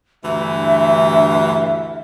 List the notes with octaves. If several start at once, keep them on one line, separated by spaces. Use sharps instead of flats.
D2 G2 E3 E5